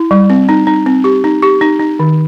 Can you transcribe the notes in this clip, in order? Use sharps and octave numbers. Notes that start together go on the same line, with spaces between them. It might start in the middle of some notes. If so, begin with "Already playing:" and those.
Already playing: E4
G3
C4
D#4
D#4
C4
G4
D#4
G4
D#4
D#4
D#3